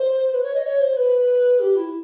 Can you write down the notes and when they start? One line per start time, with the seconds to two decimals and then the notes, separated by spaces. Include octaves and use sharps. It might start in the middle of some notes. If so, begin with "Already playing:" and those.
Already playing: C5
0.33 B4
0.43 C#5
0.54 D#5
0.65 C#5
0.80 C5
0.97 B4
1.59 G4
1.75 E4